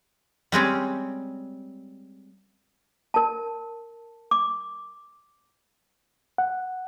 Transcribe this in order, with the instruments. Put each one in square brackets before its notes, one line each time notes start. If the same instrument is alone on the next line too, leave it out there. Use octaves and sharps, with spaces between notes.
[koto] G3 G#3 C4 C#4
[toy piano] A#4 A5
D6
[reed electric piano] F#5